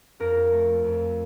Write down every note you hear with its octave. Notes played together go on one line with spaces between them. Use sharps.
F2 A#4
A3
F2